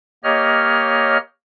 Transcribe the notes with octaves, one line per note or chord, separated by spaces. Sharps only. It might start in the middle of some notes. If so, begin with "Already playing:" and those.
A#3 G4 C#5 D#5 F6